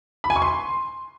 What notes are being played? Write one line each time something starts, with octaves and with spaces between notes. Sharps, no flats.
B5
G#5
C#6
C6